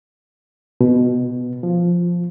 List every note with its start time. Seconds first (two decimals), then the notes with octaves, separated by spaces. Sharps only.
0.81 B2
1.63 F3